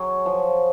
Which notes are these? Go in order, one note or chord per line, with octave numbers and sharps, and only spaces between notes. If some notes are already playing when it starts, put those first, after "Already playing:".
Already playing: F#3 G#4
F3